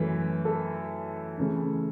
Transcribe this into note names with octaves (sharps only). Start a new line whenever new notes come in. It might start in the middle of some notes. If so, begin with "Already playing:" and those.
Already playing: F#2 E3 A3 B4
A4
C#3 E3 A3 C#4